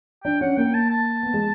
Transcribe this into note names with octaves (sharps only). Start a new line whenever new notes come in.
D4 G5
C#4 F#5
A#3 G5
A5
A5
B3
G#3